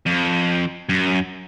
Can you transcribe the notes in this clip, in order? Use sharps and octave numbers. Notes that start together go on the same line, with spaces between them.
F2
F#2